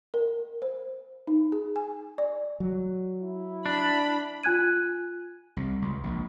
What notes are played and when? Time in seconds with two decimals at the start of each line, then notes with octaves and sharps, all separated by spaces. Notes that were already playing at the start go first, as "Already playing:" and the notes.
0.14 A#4
0.62 C5
1.27 D#4
1.52 G#4
1.76 G#5
2.18 D5
2.60 F#3
3.22 E4
3.66 D4 B5
4.43 F4 G#5 F#6 G#6 D#7
5.57 C2
5.82 C#2
6.03 A#1